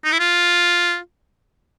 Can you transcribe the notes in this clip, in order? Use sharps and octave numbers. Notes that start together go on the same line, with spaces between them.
D#4
E4
F4